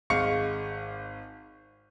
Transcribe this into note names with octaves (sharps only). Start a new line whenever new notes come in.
G#1 G#3 F5 C#6 C#7